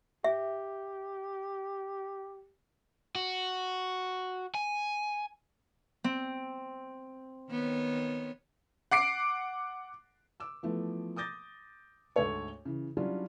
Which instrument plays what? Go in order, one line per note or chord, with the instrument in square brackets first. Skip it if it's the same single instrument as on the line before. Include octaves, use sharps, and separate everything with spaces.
[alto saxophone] G4 [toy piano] E5
[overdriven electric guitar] F#4
G#5
[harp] C4
[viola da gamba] D#3 B3 C#5
[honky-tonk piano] F#5 D6 C7 D7
[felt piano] D6 E6
E3 F3 A3 B3
D6 D#6 G6 A6 A#6
D2 G#2 A3 A4 C#5 C#6
C#3 E3
F#3 G3 C#4 D4 E4 F4